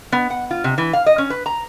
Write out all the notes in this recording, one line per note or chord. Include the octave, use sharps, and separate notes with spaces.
B3
F#5
F4
C3
E3
F5
D#5
C#4
B4
A#5